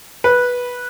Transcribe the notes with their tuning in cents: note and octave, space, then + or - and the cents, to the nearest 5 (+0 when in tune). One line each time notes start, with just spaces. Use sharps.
B4 -10